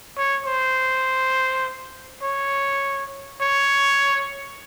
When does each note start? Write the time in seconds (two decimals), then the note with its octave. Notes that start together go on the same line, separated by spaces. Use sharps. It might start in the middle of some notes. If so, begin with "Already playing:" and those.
0.17 C#5
0.46 C5
2.23 C#5
3.41 C#5